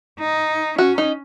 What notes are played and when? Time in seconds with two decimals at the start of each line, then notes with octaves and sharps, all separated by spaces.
0.20 D#4
0.78 C#4 F#4
0.98 D#4